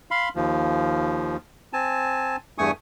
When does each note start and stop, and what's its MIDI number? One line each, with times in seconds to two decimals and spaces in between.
0.11 0.29 77
0.11 0.29 83
0.11 0.29 84
0.35 1.36 39
0.35 1.36 53
1.73 2.36 60
1.73 2.36 80
1.73 2.36 81
2.58 2.71 40
2.58 2.71 43
2.58 2.71 57
2.58 2.71 80
2.58 2.71 85
2.58 2.71 87